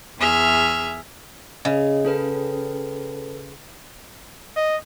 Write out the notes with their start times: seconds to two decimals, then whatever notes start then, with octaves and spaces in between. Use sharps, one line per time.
0.19 E2 G#4 E5 F6
1.65 C#3 D#5
2.05 C#4 A4 B4
4.56 D#5